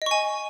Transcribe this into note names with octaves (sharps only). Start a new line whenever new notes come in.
D#5 G#5 C#6